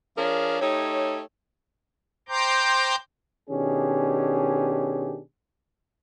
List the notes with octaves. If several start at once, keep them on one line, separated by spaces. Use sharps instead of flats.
F3 D4 G#4 A#4 C#5
A3 D#4 G4 C#5
C5 G5 A#5 C6 D6 G6
B2 D#3 C#4 D4 G4 G#4